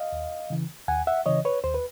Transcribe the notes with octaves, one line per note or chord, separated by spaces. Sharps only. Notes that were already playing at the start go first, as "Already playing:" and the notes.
Already playing: D#5 F5
D#2
C#3 E3
D#2 F#5 G#5
E5 F#5
C#3 E3 C#5 D#5
B4 C#5
D#2 C5
B4